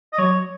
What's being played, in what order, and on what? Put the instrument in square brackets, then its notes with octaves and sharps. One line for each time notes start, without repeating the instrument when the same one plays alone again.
[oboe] D#5
[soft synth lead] F#3 [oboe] C#5